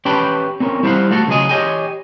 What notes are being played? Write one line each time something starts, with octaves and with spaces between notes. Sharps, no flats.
C#4 G4 B4 G5 A5 B5
C4 C#4 A#4
G3 E4 C5 D#5 F5 F#5
A3 F#4 A4
C#3 F#3 G#4 B4 D#5 G#5
G4 C#5 D#5 G5 G#5